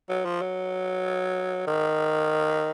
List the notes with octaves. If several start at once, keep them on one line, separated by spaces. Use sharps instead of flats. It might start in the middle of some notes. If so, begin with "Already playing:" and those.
F#3
F3
F#3
D#3